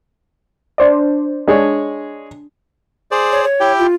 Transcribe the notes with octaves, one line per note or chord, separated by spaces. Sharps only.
D4 C5 D5
G#3 D4 G#4 C#5
G#4 C5 D5
C#5
C#5
E4 G4 G5
F4